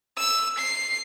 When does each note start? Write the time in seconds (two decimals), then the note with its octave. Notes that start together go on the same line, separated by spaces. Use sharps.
0.17 E6
0.58 C7